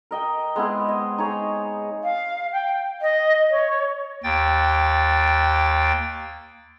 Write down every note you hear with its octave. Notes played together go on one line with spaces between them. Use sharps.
A#4 D#5 G5
G#3 B3 C4 E4
D#5
D#4 G#4 C#5
F5
G5
D#5
C#5
D#2 G5 A6